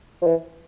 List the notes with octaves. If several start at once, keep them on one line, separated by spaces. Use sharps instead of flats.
F3
E3